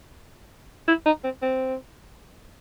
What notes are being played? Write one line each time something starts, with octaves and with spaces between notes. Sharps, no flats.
E4
D#4
C4
C4